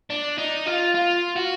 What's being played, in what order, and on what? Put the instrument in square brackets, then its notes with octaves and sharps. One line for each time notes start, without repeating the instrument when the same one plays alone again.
[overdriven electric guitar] D4
D#4
F4
F4
F#4